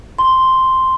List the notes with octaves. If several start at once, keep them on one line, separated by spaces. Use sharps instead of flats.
C6